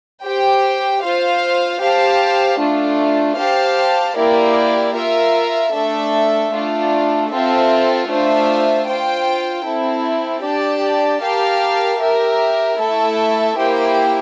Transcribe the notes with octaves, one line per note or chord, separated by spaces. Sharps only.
G4 C5 G5
F4 C5 F5
G4 C5 F5 A5
A3 D4 F4
G4 C5 F5 A5
A#3 E4 G4 A#4 D5
F4 A#4 E5
A3 D4 A4 E5
A3 D4 F4
C4 F4 A4 E5
A3 D4 F4 C5 E5
F4 C5 G5
C4 E4 A4
D4 G4 D5 A5
G4 A#4 F5 A5
G4 A#4 E5
A3 E4 A4 E5
A#3 E4 G4 C5 G5